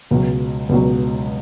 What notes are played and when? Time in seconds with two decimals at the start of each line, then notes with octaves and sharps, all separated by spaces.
0.11 C#2 B2 F#3
0.69 C#2 B2 F#3